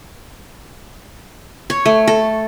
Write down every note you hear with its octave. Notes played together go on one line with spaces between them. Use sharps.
C#5
A3
A4